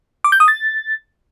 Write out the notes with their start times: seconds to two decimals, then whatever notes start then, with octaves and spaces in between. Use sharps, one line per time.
0.24 D6
0.32 G6
0.40 D#6
0.48 A6